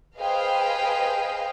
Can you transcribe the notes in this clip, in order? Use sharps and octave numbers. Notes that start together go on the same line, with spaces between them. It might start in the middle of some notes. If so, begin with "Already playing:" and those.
G#4 B4 C5 D#5 F5 G5